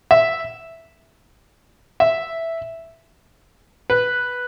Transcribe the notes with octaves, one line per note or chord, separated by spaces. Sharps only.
E5
E5
B4